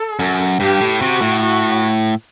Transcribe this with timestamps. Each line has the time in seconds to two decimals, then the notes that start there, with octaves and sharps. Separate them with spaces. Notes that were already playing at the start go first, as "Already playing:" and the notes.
Already playing: A4
0.19 F#2
0.60 G2 G4
0.81 A2
1.01 C3 F#4
1.21 A2
1.43 F#4